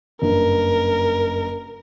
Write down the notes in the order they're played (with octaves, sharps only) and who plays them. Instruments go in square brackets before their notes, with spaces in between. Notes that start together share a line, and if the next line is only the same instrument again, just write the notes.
[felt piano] F#1 G2 [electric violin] A#4